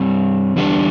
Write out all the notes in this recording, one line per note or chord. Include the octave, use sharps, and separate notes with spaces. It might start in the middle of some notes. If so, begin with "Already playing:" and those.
Already playing: G2 G3 C4
E2 D3 G3 D4